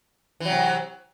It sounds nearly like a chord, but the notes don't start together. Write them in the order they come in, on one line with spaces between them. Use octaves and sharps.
E3 F#3 C3